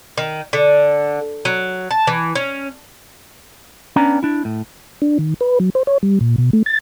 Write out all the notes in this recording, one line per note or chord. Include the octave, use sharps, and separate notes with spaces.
D#3
D3
F#3
A5
E3
C#4
B3 C#4 D4 A#5
D4 E4
A2
D4
D#3
B4
F#3
C5
C#5
G3
A#2
B2
A3
A6